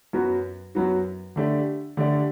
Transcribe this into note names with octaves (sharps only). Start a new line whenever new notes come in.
F#2 F#3 B3 F#4
F#2 F#3 B3 F#4
D3 A3 D4 G4 D5
D3 A3 D4 G4 D5